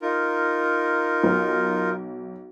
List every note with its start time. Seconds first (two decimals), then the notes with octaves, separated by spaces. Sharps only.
0.02 D#4 F4 A#4
1.23 B1